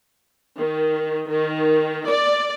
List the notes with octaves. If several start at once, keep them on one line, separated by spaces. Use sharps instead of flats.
D#3
D#3
D5